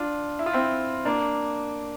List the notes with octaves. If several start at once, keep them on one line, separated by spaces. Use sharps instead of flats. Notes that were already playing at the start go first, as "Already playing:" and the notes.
Already playing: D4 F4
E4
F4
C4 E4
A#3 D4